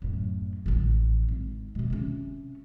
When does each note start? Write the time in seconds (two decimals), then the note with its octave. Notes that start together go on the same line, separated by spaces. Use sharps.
0.02 F#2 A2
0.66 A1 D3
1.29 G#1
1.75 B2 G#3
1.90 C3 C#4